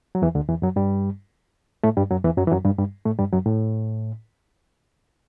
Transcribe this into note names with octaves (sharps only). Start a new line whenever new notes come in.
F#3
E2 E3
D2 D3
E2 E3
F#2 F#3
G2 G3
A2 A3
G2 G3
F#2 F#3
E2 E3
F#2 F#3
E3
F#2 F#3
G2 G3
G2 G3
A2 A3
G2 G3
F#2 F#3
A2